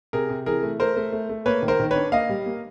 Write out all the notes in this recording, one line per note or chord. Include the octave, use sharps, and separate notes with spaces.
C3 G#4 A#4
C3
E3 G#4 A#4
A3
A3 A#4 C5
A3
A3
A3
A#3 B4 C#5
D#3
A#4 C5
D#3
B4 C#5
D4
A#3 D#5 F5
G3
A#3